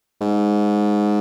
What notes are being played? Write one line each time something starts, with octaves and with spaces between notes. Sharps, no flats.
G#2